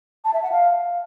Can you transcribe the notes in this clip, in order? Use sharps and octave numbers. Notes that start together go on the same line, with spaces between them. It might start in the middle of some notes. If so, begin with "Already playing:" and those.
A5
E5
F#5
F5